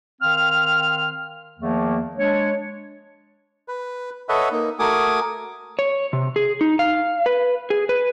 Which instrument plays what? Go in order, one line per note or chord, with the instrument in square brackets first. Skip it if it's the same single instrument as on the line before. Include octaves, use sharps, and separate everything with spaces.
[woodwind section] D#3 C4 F5 F6
E2 D#3 F3 A3 A#3
G#3 D4 C#5
[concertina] B4
A4 B4 C#5 D#5 E5 F#5
A#3 D#4
A3 F#4 A#4 G#5 D6 D#6
[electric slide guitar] C#5
C3
G#4
D#4
F5
B4
G#4
B4